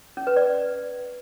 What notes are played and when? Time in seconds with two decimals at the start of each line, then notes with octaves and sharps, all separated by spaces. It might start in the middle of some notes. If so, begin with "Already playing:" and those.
0.17 C#4
0.27 B4
0.37 D5